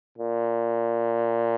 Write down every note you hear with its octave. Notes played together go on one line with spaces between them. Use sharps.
A#2